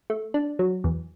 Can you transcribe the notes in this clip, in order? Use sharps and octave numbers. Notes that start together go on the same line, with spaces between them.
A3
D4
F#3
E2